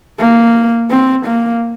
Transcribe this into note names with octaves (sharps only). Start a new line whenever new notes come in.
A#3
C4
A#3